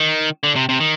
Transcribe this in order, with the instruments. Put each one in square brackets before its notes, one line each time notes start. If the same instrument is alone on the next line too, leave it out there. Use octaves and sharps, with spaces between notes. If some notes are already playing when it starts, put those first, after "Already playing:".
Already playing: [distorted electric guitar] D#3
D3
C3
C3
D#3